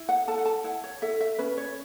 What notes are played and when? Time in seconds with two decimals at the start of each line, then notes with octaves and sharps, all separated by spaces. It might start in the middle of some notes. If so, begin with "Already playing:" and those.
Already playing: E4
0.09 F#5
0.28 A4 A5
0.38 F#5
0.46 A5
0.64 E4 F#5
0.84 C#5
1.02 A4 E5
1.21 E5
1.39 C#4 B4
1.58 C#5